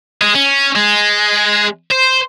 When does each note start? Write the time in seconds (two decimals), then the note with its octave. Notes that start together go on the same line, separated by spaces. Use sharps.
0.22 G#3
0.35 C#4
0.76 G#3
1.91 C5